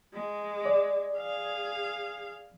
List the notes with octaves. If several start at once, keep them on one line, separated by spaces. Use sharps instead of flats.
G#3
D5
G#4 F5